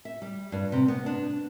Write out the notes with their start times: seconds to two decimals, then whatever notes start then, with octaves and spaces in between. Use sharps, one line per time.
0.05 E5
0.22 G3
0.52 G2
0.72 C3
0.88 B3
1.06 D4